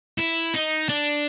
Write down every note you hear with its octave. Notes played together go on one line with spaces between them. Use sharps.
E4
D#4
D4